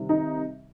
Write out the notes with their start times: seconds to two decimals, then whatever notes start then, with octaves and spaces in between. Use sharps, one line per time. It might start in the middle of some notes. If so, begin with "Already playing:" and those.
Already playing: C3 D#3 G3
0.09 D#4